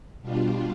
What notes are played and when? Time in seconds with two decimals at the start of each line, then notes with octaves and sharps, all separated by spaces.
0.21 B2 G3 D4 F4